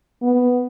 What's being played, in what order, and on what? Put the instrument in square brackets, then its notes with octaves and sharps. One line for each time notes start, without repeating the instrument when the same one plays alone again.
[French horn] B3